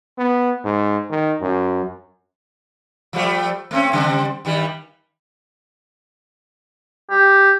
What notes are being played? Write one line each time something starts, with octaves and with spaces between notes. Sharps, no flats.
B3
G#2
D#3
F#2
F3 G3 A3
A3 C4 C#4
C#3 G3 C4
G2 D#3 G3
G4